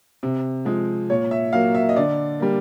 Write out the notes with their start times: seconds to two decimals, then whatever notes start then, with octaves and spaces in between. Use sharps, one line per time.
0.23 C3
0.65 F3 G#3
1.10 A#2 C#5
1.31 E5
1.53 F#3 A#3 F5
1.75 E5
1.89 D#5
1.96 D3 D5
2.40 G3 A#3